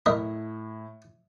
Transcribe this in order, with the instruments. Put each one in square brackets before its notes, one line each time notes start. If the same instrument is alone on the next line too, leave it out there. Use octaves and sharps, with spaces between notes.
[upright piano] A2 [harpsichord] A#4 D#5 E5